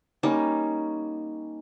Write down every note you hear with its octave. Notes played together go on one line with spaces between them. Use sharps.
G3 A#3 C#4 D#4